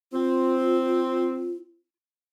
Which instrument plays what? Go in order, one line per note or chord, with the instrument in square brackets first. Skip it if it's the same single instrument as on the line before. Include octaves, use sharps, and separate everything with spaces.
[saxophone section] C4 [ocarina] F4